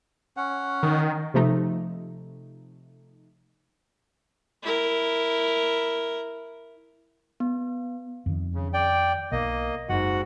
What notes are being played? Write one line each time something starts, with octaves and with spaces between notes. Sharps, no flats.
C#4 F#5
D#3
C3 F3 A3 D#4
E4 A#4
B3
F2 D#3
C#3
D5 G5
B1 A#3 D#5
F#1 G#2 F#4 F#5